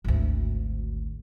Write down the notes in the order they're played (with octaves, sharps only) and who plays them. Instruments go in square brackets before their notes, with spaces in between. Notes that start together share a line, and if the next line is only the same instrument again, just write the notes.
[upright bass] G#1 D2